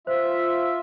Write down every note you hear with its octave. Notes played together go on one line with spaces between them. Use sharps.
F4 C5 E5